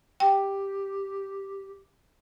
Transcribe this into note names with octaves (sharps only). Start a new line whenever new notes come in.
G4 G5